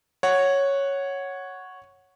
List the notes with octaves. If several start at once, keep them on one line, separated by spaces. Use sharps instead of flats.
C#5 F#5